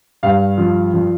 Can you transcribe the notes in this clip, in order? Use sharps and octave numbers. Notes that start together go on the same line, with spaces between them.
G2 F5
F3
F3